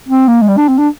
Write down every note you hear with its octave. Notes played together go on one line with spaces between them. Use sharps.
C4
A#3
G#3
G3
D4
C4
D4